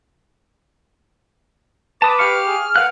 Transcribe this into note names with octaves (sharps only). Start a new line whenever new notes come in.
B4 A5 D6 D#6
G4 F5 C#6 F6
G#4
A#4 B4 F5 F#5 F#6